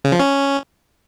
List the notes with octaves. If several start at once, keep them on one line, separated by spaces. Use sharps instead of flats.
C#3
F3
C#4